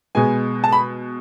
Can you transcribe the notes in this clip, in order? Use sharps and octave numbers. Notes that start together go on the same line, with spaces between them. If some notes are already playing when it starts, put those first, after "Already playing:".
B2 G#3 B3 G#5
A5
B5